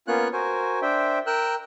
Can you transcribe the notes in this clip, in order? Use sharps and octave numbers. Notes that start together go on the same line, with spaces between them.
A#3 B3 C#4 F4 C#5 F#6
F#4 A#4 C5 G#5
D4 C5 E5 G5
A#4 G5 E6 F#6